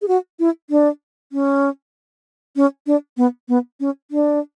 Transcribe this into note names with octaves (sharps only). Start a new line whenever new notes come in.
G#4
F#4
E4
D4
C#4
C#4
D4
B3
B3
C#4
D4